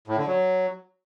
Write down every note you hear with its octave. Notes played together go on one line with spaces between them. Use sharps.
A2
D3
F#3